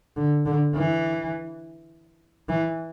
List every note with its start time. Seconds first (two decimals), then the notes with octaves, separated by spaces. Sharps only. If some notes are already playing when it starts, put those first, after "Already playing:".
0.17 D3
0.46 D3
0.76 E3
2.49 E3